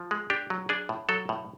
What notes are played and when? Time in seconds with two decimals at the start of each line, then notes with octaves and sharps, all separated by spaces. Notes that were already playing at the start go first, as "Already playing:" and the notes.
Already playing: F3
0.11 G#3
0.30 D4 G4
0.50 F#3
0.69 D4 G#4
0.89 A2
1.09 F#3 A4
1.29 A2